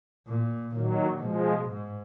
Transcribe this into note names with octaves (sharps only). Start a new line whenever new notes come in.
A#2
A#2 D#3 F#3
B2 F3 G#3
G#2